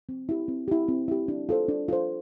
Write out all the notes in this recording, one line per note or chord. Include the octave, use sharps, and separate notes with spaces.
C4
E4 G4
C4
E4 G4
C4
E4 G4
D4
F4 A4 C5
D4
F4 A4 C5